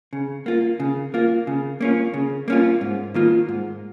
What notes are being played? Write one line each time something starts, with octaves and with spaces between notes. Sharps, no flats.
C#3
A#3 F4
C#3
A#3 F4
C#3
A#3 C#4 F4
C#3
A#3 C#4 F4
G#2
D#3 A#3 F4
G#2